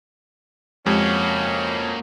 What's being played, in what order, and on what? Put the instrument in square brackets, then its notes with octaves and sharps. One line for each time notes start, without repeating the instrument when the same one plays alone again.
[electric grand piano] F2 [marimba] G#3 G4 F#5 [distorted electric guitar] A#3 F#4 [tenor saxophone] C#4